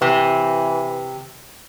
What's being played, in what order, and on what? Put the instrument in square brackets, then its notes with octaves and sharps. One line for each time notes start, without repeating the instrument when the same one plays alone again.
[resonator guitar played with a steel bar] C3 [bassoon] E3